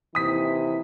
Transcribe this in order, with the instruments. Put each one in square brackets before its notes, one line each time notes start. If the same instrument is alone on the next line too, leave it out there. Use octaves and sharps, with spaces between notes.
[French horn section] D#2 C3 E3 [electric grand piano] D#6 B6